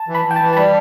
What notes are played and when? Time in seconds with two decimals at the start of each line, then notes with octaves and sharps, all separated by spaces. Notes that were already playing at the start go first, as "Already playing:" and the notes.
Already playing: A5
0.08 E3
0.15 B5
0.25 E3
0.31 G5
0.36 E3 A5
0.53 A5
0.57 G3 B5